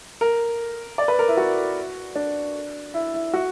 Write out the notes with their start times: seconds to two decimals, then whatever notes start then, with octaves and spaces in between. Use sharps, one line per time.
0.21 A#4
0.98 D5
1.08 B4
1.19 A#4
1.28 E4
1.37 F#4
2.16 D4
2.94 E4
3.14 E4
3.34 F#4